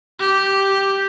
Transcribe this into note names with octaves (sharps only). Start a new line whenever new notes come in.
G4